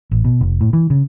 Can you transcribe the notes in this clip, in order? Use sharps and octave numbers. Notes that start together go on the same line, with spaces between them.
A1
B2
F1
A2
E3
C#3